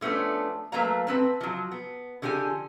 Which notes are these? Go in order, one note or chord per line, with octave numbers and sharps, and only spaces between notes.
F3 A3 B3 C#4 D4
F#3 A3 A#3 B4 F5 A#5
C4 B4 A5
F3 F#3
B3
D3 F3 G4 G#4 G#5